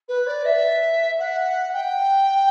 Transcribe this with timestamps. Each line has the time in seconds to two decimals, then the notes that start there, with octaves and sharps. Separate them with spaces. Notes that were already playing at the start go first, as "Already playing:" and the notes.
0.08 B4
0.26 D5
0.45 E5
1.19 F#5
1.73 G5